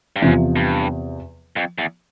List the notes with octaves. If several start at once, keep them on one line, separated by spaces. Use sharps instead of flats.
G2
E2 G#2 C3 F3
G2
F2
E2